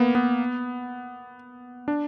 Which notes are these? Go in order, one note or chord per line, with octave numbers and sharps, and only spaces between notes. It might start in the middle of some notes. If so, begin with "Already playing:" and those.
Already playing: A#3 B3
B3
D4